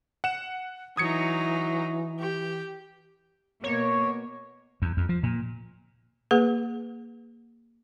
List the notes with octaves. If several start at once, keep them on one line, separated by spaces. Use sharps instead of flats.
F#5 E7
E3 F#3 D#4 D#6 G#6 C#7
G4
B2 A#3 C#5
E2
F2
F3
A#2
A#3 G#4 B4